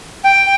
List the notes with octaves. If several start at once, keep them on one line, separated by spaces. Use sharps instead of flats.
G5